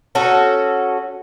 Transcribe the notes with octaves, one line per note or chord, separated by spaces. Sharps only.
C#4 F#4 A4